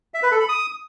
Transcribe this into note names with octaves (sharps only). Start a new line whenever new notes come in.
E5
B4
A4
B5
D#6